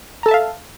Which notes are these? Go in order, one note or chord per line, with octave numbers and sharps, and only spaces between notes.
A4 E5 F5 A5 A#5